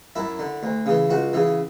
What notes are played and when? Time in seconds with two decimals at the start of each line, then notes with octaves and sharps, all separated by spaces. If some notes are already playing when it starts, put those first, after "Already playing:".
0.16 F#2 E4
0.39 D3
0.63 D2
0.86 C#3 E3
1.10 C#2 F#4
1.33 C#3 E3